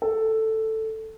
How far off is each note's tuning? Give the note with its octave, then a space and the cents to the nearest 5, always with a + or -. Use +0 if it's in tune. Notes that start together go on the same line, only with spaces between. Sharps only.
A4 +5